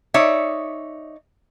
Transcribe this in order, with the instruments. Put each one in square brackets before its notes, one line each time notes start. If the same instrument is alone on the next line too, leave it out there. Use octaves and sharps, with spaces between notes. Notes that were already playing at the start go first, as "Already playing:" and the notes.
[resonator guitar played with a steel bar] D#4 C#5 D5 E5